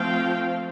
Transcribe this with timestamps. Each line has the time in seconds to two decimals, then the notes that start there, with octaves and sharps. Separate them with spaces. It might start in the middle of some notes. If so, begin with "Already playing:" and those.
Already playing: F3 A3 C4 F5 G5